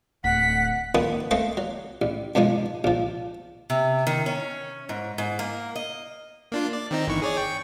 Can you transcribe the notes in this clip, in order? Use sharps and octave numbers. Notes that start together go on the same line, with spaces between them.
D1 F#5 B6
F2 D#3 A#3 B4 F#5 D#6
A3 C4 A4 D#5 F5 G5
F#3
A1
F#2 B2 F3 G#3 D#4
A#1 F3
C3
D#3
C#4
G#2
G#2
A#3
D#5
A#3 D4 F4
D5
D#3 C4 D#4
G1 E3 C#6
G#4 C#5 D5
G5 C#6